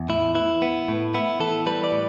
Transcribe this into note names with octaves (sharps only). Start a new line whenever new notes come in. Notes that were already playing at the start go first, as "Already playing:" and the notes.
Already playing: E2
A2 E4
E3 E4
B3
A2
B3 E4
E3 A4
G3 B4
D5
A2